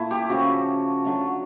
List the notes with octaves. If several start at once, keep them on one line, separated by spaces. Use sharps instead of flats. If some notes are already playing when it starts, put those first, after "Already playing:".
Already playing: A#2 A3 E4
G4
C#3 F3 A3 F#4
D3 F#3 A3